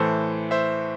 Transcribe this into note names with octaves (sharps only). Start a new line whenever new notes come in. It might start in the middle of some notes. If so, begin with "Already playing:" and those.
Already playing: A2 E3 A4 C5
C5 E5